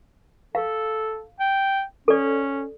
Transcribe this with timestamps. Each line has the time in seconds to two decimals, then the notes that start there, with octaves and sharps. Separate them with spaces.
0.55 A4 F5
1.40 G5
2.08 C#4 A4 D5